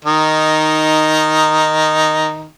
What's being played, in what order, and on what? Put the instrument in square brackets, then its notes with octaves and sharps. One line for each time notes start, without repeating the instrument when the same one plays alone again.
[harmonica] D#3 D#4